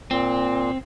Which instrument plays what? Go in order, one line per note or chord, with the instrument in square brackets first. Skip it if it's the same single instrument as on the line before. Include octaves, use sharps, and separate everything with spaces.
[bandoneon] A#2 [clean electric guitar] C4